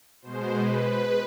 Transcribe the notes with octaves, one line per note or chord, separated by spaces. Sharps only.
B2 G#3 C5
B4
B4